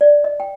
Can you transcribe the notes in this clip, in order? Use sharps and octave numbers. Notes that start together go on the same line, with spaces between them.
D5
D#5
G5